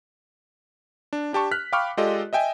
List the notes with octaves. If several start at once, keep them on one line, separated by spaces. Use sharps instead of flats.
D4
D4 G4 A5 C#6
F6 F#6 B6
F5 G5 B5 C#6 D6 F6
G#3 F4 G4 A4 D5 D#5
D#5 E5 G5 G#5